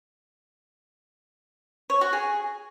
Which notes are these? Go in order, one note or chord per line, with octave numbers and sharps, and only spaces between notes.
C#5
F#4
G#4